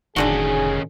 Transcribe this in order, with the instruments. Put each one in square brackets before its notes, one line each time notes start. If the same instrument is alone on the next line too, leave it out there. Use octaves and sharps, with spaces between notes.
[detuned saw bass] F1 [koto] A2 D3 F#4 [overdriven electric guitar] D#3 C#4 [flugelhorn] G#4